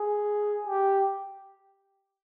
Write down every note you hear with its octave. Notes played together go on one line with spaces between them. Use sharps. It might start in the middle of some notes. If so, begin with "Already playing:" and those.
Already playing: G#4
G4